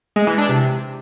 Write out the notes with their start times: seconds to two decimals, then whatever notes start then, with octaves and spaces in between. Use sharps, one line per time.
0.16 G#3
0.27 E3
0.38 D4
0.49 C3